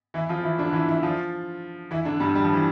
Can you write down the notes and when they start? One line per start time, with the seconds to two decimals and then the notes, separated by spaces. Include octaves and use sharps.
0.14 E3 E4
0.29 F3 F4
0.43 E3 E4
0.58 D3 D4
0.73 E3 E4
0.89 E3 E4
1.03 F3 F4
1.91 E3 E4
2.05 D3 D4
2.20 G2 G3
2.35 G3
2.44 F3
2.53 E3